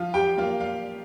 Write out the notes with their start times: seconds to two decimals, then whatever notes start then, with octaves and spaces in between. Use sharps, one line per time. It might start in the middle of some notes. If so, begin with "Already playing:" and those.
Already playing: F3 F4 F5
0.14 G4 G5
0.38 A#3 F4 F5
0.60 F4 F5